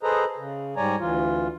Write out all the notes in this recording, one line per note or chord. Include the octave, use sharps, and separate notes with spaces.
G#4 A4 B4 C5 D#5 A#5
C#3
G#2 G3 C#5 D5 G#5 A#5
D2 E3 F4